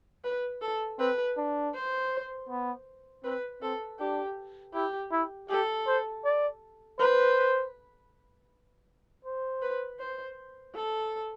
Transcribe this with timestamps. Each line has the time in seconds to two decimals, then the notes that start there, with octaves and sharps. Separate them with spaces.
0.24 B4
0.62 A4
0.99 C4 B4
1.37 D4
1.75 C5
2.49 B3
3.24 C4 B4
3.62 C4 A4
4.00 D4 G4
4.74 E4 G4
5.12 E4
5.49 G4 A4
5.87 C5
6.25 D5
6.99 B4 C5
9.25 C5
9.62 B4
9.99 C5
10.75 A4